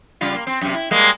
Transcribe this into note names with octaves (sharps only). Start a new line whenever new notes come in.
C#3 G3 F4
A#3
C4
F#2 C3
E4
G3 G#3 A#3